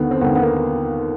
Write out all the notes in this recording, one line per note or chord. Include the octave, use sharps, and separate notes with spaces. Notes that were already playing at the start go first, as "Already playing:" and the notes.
Already playing: D#2 D3 B3
C4
D#2 D3 B3
B3
A#3